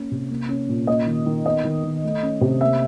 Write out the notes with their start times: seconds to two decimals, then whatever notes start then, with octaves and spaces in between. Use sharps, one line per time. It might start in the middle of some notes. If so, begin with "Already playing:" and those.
Already playing: A#3 C#4
0.11 C3
0.31 A#3
0.49 C#4
0.68 A#2
0.87 A#3 D#5
1.06 D#3
1.26 D#3
1.46 B3 D#5
1.64 D#3
1.84 D#3
2.04 A3
2.23 C#4
2.41 C3
2.61 A#3 E5